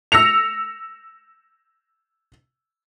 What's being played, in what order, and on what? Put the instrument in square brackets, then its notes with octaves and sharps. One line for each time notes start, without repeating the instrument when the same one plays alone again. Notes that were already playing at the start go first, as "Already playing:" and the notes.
[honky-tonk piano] E6 A#6 C#7 F7